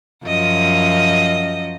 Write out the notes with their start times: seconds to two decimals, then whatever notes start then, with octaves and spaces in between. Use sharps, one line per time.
0.25 F#2 F3 D#5